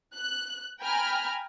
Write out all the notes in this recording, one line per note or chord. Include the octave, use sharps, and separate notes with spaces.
F#6
G5 G#5 A#5 B5 F6